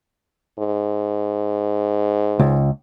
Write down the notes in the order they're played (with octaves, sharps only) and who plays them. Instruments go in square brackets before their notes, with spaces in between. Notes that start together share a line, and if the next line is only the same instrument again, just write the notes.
[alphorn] G#2
[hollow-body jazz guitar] C#2